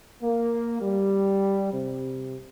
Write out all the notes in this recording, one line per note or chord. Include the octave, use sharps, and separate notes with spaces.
A#3
G3
C3